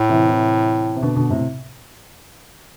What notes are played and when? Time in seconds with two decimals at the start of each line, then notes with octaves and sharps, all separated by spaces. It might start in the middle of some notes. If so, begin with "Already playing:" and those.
Already playing: A2
0.09 C3 E3
0.28 C3 E3
0.96 C3
1.03 B2 D3
1.16 B2 D3
1.30 A2 C3